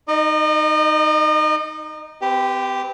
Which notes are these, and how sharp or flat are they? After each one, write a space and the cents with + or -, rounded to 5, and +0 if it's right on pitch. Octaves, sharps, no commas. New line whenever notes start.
D#4 +0 D#5 -40
C4 -40 G4 +0 B4 +0